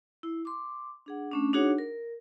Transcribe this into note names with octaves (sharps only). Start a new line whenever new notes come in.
E4
C6 D6
D4 G#4 F#5
A3 C#4 D4
D4 D#4 F#4 G#4 C#5 F#5
A#4